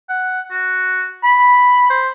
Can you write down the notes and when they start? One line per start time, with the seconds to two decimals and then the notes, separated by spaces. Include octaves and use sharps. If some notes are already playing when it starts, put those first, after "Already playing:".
0.09 F#5
0.51 F#4
1.23 B5
1.90 C5